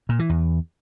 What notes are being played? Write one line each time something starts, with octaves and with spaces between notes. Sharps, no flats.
A#2
E3
E2